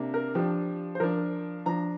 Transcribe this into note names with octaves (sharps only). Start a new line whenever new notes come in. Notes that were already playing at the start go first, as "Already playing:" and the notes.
Already playing: C3 A#3 D4
A#4
F3 D4 G4
C5
F3 D4 A#4
F3 D4 A#5